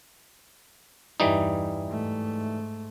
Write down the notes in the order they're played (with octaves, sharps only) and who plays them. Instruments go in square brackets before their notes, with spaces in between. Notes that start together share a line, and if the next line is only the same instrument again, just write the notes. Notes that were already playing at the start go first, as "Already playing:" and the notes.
[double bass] E2 G2 [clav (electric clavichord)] E3 G3 D#4
[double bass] G#2 A3